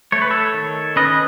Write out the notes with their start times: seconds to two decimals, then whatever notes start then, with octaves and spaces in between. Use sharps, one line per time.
0.12 A3 C#5
0.22 B4
0.30 A4 C#5
0.54 D#3
0.96 C#4 B4 D#5